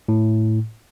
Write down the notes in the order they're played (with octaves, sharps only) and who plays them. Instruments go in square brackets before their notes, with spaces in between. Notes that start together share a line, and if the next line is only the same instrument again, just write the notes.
[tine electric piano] A2